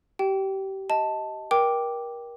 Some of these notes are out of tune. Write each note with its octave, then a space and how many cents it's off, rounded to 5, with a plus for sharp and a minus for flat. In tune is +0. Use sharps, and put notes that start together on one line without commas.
G4 -25 G5 -15
D#5 +20 A5 +0
A#4 +30 G5 +0 D6 +0